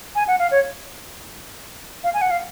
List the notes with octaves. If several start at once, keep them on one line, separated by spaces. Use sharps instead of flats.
G#5
F#5
F5
C#5
F5
G#5
F#5
F5